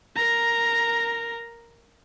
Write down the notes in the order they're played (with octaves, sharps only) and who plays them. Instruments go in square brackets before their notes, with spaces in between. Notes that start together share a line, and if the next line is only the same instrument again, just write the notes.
[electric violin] A#4 A#5